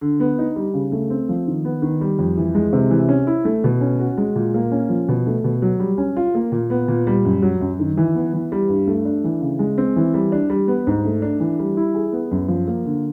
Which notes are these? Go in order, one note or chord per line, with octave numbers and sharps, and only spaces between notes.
D3
B3
D#4
G3
C#3
A3
C4
F3
D#3
B3
D#3
G3
F2
E3
G#3
C3
E3
C#4
E4
A3
B2
C#4
F#4
G#3
A#2
A#3
C#4
F3
B2
A3
B2
F#3
G3
C#4
F4
A#3
A#2
B3
A#2
G3
F#2
F#3
F#2
D#3
E3
B3
E3
G3
G2
A3
D4
E3
C#3
G#3
C4
E3
G3
D4
G3
B3
G#2
A3
D4
E3
G3
E4
G#4
B3
F#2
F3
A#3
D3